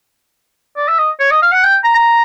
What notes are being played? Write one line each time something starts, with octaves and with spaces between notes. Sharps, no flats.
D5
E5
D#5
C#5
D#5
F5
F#5
G5
A#5
A#5